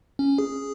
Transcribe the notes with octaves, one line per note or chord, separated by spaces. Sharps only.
C#4
G#4